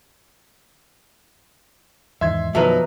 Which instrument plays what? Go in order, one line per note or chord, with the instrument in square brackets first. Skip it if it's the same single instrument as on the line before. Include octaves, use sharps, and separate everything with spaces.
[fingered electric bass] E2 G#2 D#3 [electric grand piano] E5 C6 G#6
[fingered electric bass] F#2 B2 D#3 [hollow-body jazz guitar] F3 F#3 A#4 [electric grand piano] B4 E5